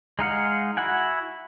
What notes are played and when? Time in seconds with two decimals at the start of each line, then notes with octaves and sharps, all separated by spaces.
0.19 G#3 D#4 F5 F#5
0.77 E4 F#4 F#5 G#5